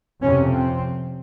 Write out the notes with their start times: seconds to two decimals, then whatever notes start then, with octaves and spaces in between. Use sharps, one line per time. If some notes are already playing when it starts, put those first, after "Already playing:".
0.22 F2 C3 C#4
0.52 C4